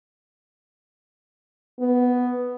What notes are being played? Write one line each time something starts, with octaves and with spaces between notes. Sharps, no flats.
B3